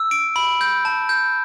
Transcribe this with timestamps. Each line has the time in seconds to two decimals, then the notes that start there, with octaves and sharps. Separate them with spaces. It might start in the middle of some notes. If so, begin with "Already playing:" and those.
Already playing: E6
0.11 D7
0.36 B5
0.61 G6
0.85 A5
1.09 G6